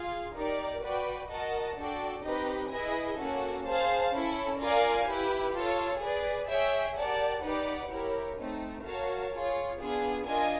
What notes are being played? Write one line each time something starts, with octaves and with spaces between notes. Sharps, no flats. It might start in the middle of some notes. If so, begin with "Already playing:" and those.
Already playing: F4 G#4 F5
D#4 G4 A#4 D5
F#4 B4 D5 G5
F#4 A#4 D#5 F#5 A5
D4 F#4 A4 D5 G5
C4 D#4 G4 B4 D#5
E4 G#4 B4 D#5 G#5
A#3 C#4 F#4 A4
G#4 C5 F5 A5
C#4 E4 A4
F4 A#4 D5 F5 G#5
E4 G4 B4
F4 A4 C#5
G#4 B4 D5
G#4 C#5 E5 G5
G4 A#4 D5 F#5 A5
D#4 G4 B4 D5 F#5
E4 G4 A#4 C#5
A3 C4 D#4
F#4 A#4 C#5 F5 A5
F4 G#4 C#5
B3 D4 F4 G#4
D4 F4 A#4 D#5 G#5